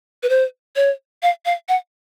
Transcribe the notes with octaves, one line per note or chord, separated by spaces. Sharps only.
B4
C5
C#5
F5
F5
F#5